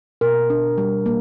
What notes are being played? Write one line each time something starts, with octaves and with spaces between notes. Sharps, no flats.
B2 A#4
D4
G3
A#3